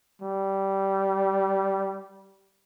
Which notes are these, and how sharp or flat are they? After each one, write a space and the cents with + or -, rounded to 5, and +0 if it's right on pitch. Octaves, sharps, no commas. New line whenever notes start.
G3 -15